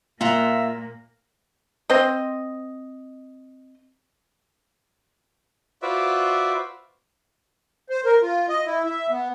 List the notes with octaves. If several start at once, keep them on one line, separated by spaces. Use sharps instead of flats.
A#2 A#3 F4 E5 F#5 A#5
C4 C5 D#5
F4 F#4 B4 C5 D5 E5
C5
A#4
F4
D#5
E4
E5
B3